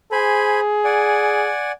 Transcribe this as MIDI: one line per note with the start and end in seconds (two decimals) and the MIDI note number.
0.12 1.51 68
0.12 0.60 72
0.12 0.60 80
0.12 0.60 83
0.84 1.72 74
0.84 1.72 78
0.84 1.72 80